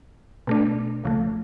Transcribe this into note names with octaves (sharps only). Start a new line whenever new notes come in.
B2 A3 D4
C#2 C#3 F3 A3